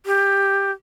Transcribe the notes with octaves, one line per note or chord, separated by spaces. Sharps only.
G4